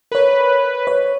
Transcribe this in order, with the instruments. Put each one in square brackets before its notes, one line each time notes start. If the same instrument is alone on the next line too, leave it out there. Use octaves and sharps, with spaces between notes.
[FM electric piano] A#4 C#5 [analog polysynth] B4
[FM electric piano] C#5